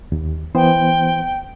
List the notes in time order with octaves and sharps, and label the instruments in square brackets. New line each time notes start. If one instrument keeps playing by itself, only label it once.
[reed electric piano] D#2
[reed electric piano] E3 B3 C5 [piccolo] G5